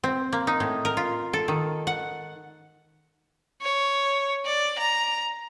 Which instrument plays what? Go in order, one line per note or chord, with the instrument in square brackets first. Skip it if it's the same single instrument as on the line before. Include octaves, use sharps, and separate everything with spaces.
[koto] C4
A#3
D#4
A2
A#4
F4
A4
D#3
F#5
[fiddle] C#5
D5
A#5